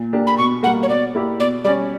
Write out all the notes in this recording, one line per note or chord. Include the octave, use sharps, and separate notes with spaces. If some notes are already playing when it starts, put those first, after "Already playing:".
Already playing: A#2
A#3 D4 G4
B5
B2 C#6
G3 A#3 F#5
C#5
B2 D5
A#3 E4 G4
B2 D5
G3 C#4 D5